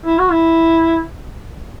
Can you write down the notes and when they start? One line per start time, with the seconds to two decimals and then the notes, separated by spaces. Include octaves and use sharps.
0.06 E4
0.19 F#4
0.31 E4